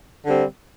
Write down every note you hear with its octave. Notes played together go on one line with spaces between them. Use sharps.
D3 G3 C4